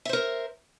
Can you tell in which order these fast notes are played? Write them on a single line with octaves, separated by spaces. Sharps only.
E5 C5 A#4